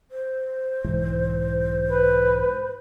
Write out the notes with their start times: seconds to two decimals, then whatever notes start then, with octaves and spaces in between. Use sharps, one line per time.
0.11 C5
0.84 B1 G#2 E3
1.89 B4